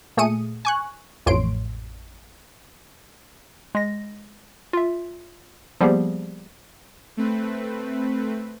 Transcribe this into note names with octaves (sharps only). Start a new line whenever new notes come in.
A#2 A3 G#4 D#6 C#7 D#7
G#5 C#6 F#6
A1 F2 A2 C#5 C6 D7
G#3 A#6
F4 E5
F3 G3 A#3 B3 G4 G#4
A3 C4 B4